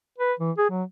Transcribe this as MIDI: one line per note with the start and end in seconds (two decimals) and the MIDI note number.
0.18 0.33 71
0.39 0.51 52
0.57 0.66 68
0.70 0.83 54